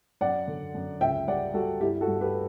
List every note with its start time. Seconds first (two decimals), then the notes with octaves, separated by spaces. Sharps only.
0.21 F#2 D5 F#5
0.48 D3
0.74 F#2
1.01 C#2 E5 G5
1.27 G3 D5 F#5
1.54 G3 F#4 A4
1.81 G2 E4 G4
2.01 F#4 A4
2.07 G2
2.21 G4 B4